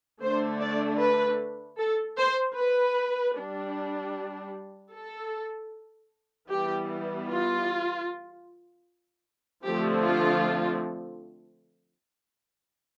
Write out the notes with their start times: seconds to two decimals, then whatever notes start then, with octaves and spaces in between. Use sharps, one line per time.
0.21 D3 A3 D4 C5
0.60 D5
1.00 B4
1.78 A4
2.18 C5
2.58 B4
3.36 G3 D4
4.93 A4
6.50 E3 G3 B3 G4
7.29 F4
9.65 D3 F3 A3 C4 G4
10.04 F4